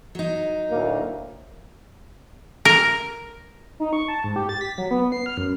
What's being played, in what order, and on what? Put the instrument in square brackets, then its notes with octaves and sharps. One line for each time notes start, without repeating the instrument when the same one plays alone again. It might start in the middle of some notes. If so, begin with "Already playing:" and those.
[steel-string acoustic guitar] F#3 D#4
[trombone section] D2 A2 A#3
[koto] A#4
[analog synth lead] D#4
C#6
A5
G#2
G4
A6
B6
F#3
B3
C7
F6
F#2